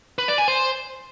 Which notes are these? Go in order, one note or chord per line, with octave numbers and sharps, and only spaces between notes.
B4
D5
G#5
C5